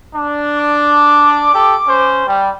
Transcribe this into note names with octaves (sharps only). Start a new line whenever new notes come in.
D4
D6
G4 A4
C#4 C5
G3